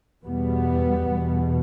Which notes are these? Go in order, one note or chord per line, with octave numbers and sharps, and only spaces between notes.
E2 B2 G3 B3
E2 B2